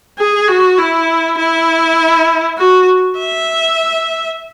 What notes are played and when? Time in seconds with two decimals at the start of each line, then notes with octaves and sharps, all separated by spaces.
0.19 G#4
0.48 F#4
0.79 E4
1.38 E4
2.58 F#4
3.19 E5